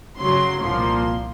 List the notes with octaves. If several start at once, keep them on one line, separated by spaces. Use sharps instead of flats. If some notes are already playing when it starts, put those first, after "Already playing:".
F#2 C#3 F#3 C6
C2 A#2 F3 A#3 C6